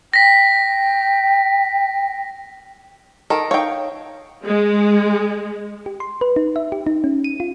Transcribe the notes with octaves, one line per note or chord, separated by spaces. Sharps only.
G5 A#6 B6
D#3 A4 A#4
D#4 C#5 F5 G5
G#3
G4
C6
B4
D#4
E5
G4
D#4
C#4
D#7
F4